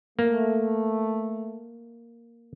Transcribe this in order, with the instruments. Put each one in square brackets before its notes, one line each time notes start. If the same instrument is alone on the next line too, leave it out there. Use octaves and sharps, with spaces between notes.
[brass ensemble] A3 [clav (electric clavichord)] A#3